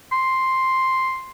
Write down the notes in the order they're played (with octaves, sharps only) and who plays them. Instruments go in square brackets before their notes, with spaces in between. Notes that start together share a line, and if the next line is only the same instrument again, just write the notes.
[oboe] C6